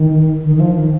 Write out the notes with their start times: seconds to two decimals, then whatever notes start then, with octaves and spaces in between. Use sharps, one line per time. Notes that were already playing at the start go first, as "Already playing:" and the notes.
Already playing: D#3
0.44 D#3
0.55 D#3
0.60 F3
0.75 D#3